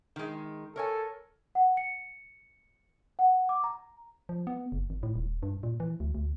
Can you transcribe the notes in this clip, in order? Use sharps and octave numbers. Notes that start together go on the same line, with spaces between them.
D#3 G#3
A4 A#4 C#5 G#5
F#5
C#7
F#5
D6
A#5
F3
B3
F#1
G#1
A2
D#1
G2
A#2
E3
D2
D2